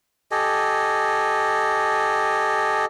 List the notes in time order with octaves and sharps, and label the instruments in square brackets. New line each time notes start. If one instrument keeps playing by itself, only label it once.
[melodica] G4 A4 D#5 G#5